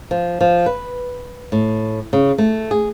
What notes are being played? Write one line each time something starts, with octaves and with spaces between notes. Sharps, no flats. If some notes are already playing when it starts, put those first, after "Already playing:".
F3
F3
B4
A2
C#3
A3
G#4